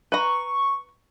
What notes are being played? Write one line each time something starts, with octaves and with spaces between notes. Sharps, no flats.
B4 A#5 C#6